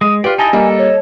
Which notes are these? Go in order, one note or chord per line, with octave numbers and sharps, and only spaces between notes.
G#3 D#6
F4 G4 B4 D5
D#4 E4 D#5 G#5 A5
G3 A#3 A4 D#5
C#5